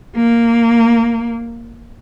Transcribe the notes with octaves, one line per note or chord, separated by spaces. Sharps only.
A#3